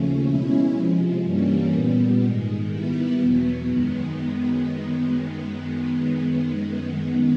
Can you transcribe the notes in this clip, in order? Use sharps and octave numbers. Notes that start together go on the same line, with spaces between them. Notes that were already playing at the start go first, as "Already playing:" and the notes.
Already playing: D#2 C#3 F3 A3 C#4
B2 G#3 C#4 E4
C3 F3 G#3
G2 E3 G3 A#3 C#4
A#2 G3 B3
G#2 D#3 G#3
D#3 G3 B3 E4
E2 B2 F#3 B3
F#2 D#3 G#3 B3